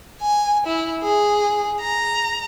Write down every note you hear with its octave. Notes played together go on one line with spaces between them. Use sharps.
G#5
E4
G#4
A#5